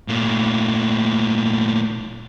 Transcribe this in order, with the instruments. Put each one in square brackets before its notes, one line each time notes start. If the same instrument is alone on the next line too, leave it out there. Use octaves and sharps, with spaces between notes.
[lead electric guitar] A#2 A3